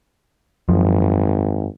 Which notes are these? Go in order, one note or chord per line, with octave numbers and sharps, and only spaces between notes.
G#1 F#2 F3